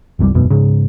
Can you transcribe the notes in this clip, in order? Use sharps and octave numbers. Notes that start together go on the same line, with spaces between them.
F#1 C2 A2 G3
E1 B1 F#2 B2
G#2 C#3